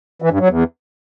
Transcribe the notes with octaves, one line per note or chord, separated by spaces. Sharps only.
E3
G2
F#3
E2